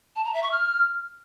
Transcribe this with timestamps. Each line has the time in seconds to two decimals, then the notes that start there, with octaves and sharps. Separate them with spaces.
0.15 A5
0.24 A#5
0.33 E5
0.42 C#6
0.51 F6